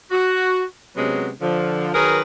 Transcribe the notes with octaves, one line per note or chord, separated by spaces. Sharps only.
F#4
C3 F#3 G#3 B3 C#4
D3 F3
D#3 F#3 G#4 A#4 B4